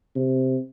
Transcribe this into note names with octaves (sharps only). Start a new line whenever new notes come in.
C3